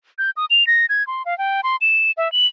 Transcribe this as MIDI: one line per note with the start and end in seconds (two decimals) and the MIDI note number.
0.18 0.30 91
0.37 0.45 87
0.50 0.66 101
0.67 0.86 94
0.89 1.06 92
1.07 1.23 84
1.26 1.37 77
1.38 1.61 79
1.63 1.76 84
1.81 2.11 100
2.17 2.31 76
2.32 2.47 102